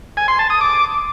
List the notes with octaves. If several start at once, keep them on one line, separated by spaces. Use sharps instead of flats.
G#5
C6
A5
D#6
D6